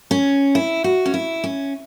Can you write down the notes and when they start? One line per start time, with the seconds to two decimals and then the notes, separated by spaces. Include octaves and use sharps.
0.11 C#4
0.55 E4
0.84 F#4
1.06 C#4
1.14 E4
1.44 C#4